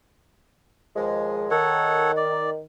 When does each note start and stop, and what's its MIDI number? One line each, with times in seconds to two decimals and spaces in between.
0.96 1.48 39
0.96 1.48 53
0.96 1.48 56
1.51 2.60 51
1.51 2.12 69
1.51 2.12 73
1.51 2.12 78
2.17 2.50 74